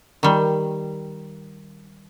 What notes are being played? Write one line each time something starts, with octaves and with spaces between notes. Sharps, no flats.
D#3 G3